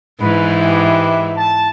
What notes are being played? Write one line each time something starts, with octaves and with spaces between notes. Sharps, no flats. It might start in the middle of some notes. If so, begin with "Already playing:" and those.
G#2 E3 B4
G4 B4 E5
A5